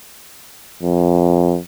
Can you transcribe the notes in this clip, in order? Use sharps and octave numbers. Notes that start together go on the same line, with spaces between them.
F2